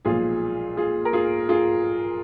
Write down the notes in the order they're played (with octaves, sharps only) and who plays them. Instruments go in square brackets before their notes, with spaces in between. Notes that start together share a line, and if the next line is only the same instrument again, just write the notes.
[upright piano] B1 A#2 F3 G#3 F4 G#4
F4 G#4
A#4
F4 G#4
F4 G#4